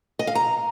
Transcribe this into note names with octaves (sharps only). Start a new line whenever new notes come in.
D#5
F5
A#5